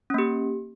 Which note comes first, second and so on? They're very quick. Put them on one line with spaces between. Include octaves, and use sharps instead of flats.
C#4 A#3 G4